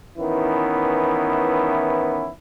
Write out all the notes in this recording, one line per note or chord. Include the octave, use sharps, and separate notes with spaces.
D#3 E3 B3 C#4 E4